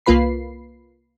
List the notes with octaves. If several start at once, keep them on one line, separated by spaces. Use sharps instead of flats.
C2 A#3 F4 B4 B5 C7